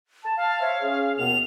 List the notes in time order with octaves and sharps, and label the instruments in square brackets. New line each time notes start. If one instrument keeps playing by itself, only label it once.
[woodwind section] A5
[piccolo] F5
[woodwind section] C5 C#5 E5
C#4 G#4
[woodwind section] D#2 B2 B3 [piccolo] F7